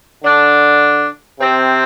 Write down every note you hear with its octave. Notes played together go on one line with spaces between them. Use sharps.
D3 D4
C3 C4